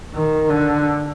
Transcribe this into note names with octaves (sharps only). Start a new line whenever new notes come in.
D#3
D3